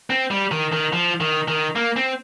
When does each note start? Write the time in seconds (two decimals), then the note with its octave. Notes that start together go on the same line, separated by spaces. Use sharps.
0.10 C4
0.31 G3
0.51 D#3
0.72 D#3
0.93 F3
1.21 D#3
1.48 D#3
1.76 A#3
1.96 C4